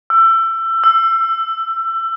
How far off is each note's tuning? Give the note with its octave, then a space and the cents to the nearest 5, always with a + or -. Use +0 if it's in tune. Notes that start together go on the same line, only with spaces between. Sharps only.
E6 +25
E6 +10